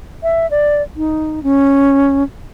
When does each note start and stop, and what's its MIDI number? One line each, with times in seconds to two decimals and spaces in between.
0.23 0.49 76
0.51 0.82 74
0.96 1.43 63
1.43 2.23 61